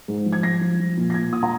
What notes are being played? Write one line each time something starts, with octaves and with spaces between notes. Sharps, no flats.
G#2
F3
G#6
F3 A#6
F3
F3
A#2
A#6
A#2 G#6
A#2 D#6
A#5